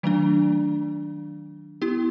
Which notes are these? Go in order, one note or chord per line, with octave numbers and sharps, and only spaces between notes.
D#3 F#3 A3 D4
B3 E4 G4